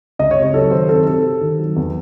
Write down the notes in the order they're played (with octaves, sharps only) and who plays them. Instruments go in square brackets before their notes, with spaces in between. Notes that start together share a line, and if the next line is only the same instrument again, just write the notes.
[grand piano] C#2 D#5
C#5
C3
C#5
F#3 A4
D#3 C5
C3 A4
C3 A4
C3
D#3
F#3
E2